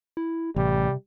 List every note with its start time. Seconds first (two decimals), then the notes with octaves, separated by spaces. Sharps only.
0.17 E4
0.56 A1 C3 G3